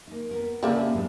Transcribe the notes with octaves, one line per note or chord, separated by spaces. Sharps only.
A#3 D#4
B3 A#4
C#3 G3 A#3 D4 E4 E5
G#2 F#3 B3